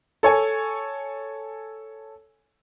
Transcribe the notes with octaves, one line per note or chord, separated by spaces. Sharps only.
A4 C#5 G#5